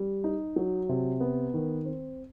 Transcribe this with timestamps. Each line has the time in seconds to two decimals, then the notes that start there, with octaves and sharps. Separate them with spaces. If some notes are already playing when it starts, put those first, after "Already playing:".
Already playing: G3
0.24 D#4
0.56 F#3
0.89 C3
1.20 B3
1.54 D#3
1.85 C4